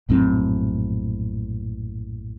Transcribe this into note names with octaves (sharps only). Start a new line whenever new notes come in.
A#1 F#2 A2 C4